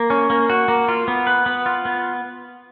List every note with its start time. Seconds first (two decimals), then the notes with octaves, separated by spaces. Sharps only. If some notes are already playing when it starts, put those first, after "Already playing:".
Already playing: A#3
0.10 C#4
0.30 A#3
0.50 F#4
0.68 A#3
0.89 F4
1.08 B3
1.27 B4
1.46 B3
1.66 F4
1.85 B3